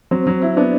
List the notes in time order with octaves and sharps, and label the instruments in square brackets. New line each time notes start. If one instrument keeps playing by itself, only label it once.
[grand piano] F#3 [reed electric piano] C4 C5
[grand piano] F#3
E4
[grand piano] B3 [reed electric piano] D4 D5